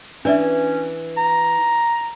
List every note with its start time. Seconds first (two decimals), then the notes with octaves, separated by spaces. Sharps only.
0.25 E3 C#4 D4 D5 E5
1.17 A#5